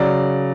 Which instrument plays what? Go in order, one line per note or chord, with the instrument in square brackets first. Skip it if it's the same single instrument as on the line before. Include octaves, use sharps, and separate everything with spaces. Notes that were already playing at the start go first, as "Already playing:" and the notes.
Already playing: [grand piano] C#3 F#3 D5